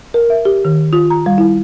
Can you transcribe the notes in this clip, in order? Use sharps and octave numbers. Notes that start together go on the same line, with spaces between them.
A#4
E5
G4
D#3
F4
A#5
G3
E4